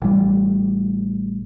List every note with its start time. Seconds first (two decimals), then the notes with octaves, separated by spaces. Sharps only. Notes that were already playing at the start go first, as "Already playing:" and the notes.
0.02 A1 A2 G3